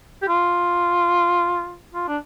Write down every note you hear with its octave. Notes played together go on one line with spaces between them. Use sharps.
G4
F4
F4
D4